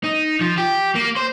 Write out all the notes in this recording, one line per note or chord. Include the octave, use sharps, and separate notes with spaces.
D#4
F3
G4
A#3
C5